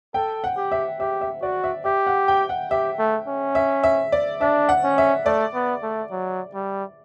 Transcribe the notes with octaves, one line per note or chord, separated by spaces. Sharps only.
A4 G5
F#5
G4
E5
G4 E5
E5
F#4 D5
E5
G4 E5
F#5
G5
F#5
G4 E5
A3
C#4
E5
E5
D5
D4 E5
F#5
C#4
E5
A3 D5
B3
A3
F#3
G3